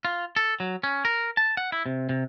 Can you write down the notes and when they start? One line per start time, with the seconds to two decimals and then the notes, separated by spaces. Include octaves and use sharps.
0.05 F4
0.36 A4
0.60 F#3
0.84 C#4
1.05 A#4
1.37 A5
1.57 F#5
1.72 E4
1.86 C3
2.09 C3